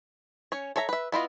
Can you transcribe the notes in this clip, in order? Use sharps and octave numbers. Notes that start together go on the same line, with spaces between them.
C#4 C#5
A4 C#5 E5 A#5
B4 E5
B3 E4 F4 D#5